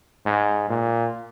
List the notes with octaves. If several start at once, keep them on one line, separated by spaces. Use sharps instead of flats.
G#2
A#2